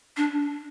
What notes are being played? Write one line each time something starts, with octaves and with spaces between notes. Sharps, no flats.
D4